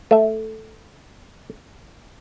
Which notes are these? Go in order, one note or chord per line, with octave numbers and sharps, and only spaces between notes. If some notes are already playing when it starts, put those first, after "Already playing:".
A3 E5